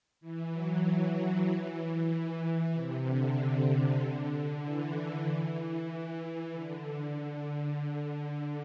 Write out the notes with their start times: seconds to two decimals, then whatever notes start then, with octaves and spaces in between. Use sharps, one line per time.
0.21 E3
0.53 F#3
0.83 E3
1.15 F#3
1.47 E3
2.74 C3
3.05 D3
4.63 E3
6.53 D3